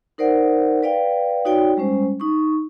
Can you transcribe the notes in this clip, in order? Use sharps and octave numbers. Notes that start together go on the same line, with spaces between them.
D#4 A#4 C5 D5 F#5
B4 D5 F5 G5
D#4 F#4 C#5 D5 G5
G3 G#3 C#4 C5
D#4 C#6